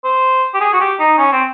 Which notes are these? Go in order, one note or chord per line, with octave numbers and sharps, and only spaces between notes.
C5
G4
G#4
F#4
G4
D#4
C#4
C4